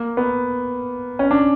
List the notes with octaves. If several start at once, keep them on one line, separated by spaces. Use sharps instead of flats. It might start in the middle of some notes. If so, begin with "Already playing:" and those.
Already playing: A#3
B3
C#4
D4